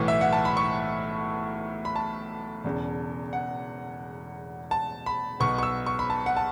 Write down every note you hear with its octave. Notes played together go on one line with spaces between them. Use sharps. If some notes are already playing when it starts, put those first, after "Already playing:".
Already playing: B1 A2 E3 B3 C#6
E5
F#5
A5
B5
C#6
B5
A5
E1 E2 C#3
F#5
A5
B5
B1 B2 B3 C#6
C#6
E6
C#6
B5
A5
F#5
A5